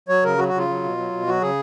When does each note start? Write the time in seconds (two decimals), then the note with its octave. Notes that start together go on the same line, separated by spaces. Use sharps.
0.08 F#3 C#5
0.24 C#3 A#4
0.38 F#3 F#4
0.48 F#4
0.54 C#3 F4
0.69 F#3
0.83 B2
0.98 F#3
1.13 B2
1.27 F#3 F#4
1.42 C#3 G#4